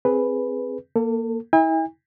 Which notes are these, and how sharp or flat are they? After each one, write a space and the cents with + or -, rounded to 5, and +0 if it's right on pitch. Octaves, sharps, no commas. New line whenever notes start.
C4 +0 G#4 +0 B4 +0
A#3 +0 A4 +35
E4 -40 G#5 -45